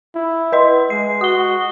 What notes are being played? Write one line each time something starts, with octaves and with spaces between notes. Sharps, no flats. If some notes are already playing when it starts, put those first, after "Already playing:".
E4
B4 D#5 C6
G#3 C7
F#4 D#6 G7